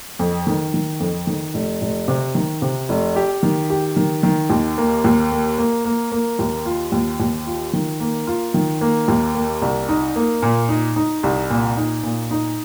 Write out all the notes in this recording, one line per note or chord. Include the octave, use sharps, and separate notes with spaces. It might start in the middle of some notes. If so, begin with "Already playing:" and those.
F2
D#3
D#3
F2
D#3
F1
F1
C3
D#3
C3
F1
G4
D#3
G4
D#3
D#3
D#2
A#3
D#2
A#3
A#3
A#3
A#3
D#2
F4
D#2
D#2
F4
D#3
A#3
F4
D#3
A#3
D#2
A#3
C2
D#4
A#3
A#2
D#4
D#4
C2
A#2
D#4
A#2
D#4